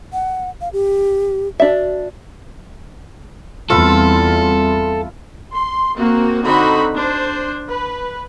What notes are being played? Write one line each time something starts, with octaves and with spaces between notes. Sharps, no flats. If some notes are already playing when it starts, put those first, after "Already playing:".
F#5
F5
G4
D4 F#4 E5
E2 G3 C4 F4 A4 E5 B5 C6
C6
A#3 C4 F#4
D3 C4 D#4 F#4 B5
D4 C5
B4